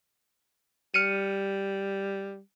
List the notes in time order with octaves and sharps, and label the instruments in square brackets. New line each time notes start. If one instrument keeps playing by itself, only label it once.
[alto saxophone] G3 [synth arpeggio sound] F6 C#7 D#7